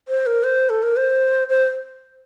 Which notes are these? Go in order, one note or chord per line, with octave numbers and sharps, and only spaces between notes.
C5
A#4
C5
A4
A#4
C5
C5